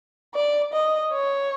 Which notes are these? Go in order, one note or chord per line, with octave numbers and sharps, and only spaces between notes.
D5
D#5
C#5